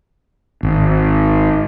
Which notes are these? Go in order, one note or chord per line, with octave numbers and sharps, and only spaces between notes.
G#1